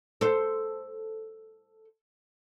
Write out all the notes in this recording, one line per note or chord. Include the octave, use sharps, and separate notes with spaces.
A4 C5